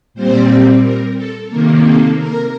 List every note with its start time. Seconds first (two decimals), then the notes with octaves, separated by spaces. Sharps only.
0.14 A#2 G3 C4 C5
0.82 A#4
1.16 A4
1.49 C3 D#3 A#3 A#4
1.83 A4
2.17 A#4